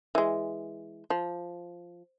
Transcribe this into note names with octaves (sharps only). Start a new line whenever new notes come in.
E3 G#3
F3